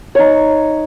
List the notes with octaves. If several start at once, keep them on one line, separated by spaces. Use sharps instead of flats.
D#4 C#5